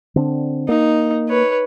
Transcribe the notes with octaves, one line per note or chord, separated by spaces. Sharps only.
D3 C4 D4
A#3 D#4
B4 C#5